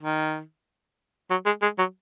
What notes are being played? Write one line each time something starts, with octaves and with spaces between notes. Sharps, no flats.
D#3
F#3
G#3
G#3
F#3